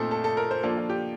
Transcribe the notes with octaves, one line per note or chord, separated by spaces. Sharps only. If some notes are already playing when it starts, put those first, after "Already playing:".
Already playing: A#2 A3 C4 D#4 A4
A4
A4
A#4
C5
F3 A#3 D4 A4
F4
G4